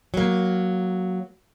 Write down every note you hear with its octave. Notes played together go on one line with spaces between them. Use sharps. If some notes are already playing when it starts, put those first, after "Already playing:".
F#3 A#3